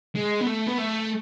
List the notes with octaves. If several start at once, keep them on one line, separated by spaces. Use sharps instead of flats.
G#3
B3
A3
B3
A3